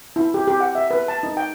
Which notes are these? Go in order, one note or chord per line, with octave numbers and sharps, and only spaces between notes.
E4
G4
G4
F#5
E5
B4
A5
D#4
G5